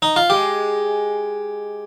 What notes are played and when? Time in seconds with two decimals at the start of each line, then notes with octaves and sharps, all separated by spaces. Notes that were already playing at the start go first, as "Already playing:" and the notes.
0.02 D#4
0.16 F4
0.30 G#3 G4